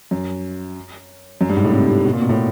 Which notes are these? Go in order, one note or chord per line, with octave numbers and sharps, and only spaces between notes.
F#2
F#2
G2
G#2
A2
C3
C3
B2
A#2
B2
A2